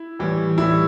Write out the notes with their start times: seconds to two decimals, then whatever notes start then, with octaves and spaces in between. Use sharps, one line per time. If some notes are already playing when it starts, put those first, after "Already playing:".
Already playing: E4
0.19 A2 E3 G3
0.58 A2 E3 G3 E4